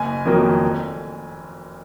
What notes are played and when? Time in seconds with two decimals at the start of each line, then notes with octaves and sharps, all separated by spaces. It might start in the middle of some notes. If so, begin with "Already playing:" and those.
Already playing: F#1 G#5
0.25 F2 D#3 F#3 A#3
0.63 F1